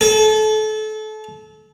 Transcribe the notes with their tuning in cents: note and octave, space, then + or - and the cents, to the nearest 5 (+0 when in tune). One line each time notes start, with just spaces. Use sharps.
A4 -30